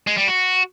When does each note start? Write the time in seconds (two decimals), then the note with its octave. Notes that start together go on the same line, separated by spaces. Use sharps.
0.07 G#3
0.17 G3
0.28 F#4